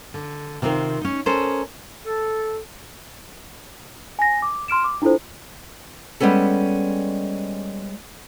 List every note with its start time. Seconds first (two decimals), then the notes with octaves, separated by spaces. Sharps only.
0.14 D3
0.62 C3 D#3 C4 F4 A#4
1.01 C#4 D#4
1.26 C#4 A4 A#4 C5 C#5 D#5
2.06 A4
4.19 G#5 A#6
4.42 D6
4.68 C6 F6 D7 E7
4.84 D6
5.02 D4 E4 F4 A4 C5
6.20 G3 G#3 B3 C#4 A4